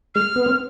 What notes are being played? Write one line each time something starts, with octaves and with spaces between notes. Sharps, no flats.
G#3 F6
B3
C4